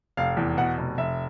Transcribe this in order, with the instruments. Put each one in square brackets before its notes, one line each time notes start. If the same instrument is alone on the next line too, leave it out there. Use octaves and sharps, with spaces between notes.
[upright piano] F1 F5
E2
B2 F#5
F1
F1 E5